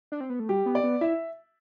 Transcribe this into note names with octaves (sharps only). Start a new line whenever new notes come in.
D4
C4
B3
A3
G3 G4
B3
D5
B3
E4 E5